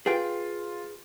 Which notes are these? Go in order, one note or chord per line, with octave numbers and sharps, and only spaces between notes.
F4 G#4 B4 G5